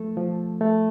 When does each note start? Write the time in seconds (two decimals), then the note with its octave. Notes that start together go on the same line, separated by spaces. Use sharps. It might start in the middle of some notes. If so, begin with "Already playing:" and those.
Already playing: F3 A3 A4
0.17 F3
0.61 A3